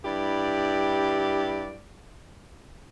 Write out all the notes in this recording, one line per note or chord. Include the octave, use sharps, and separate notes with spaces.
G2 E4 G4 D5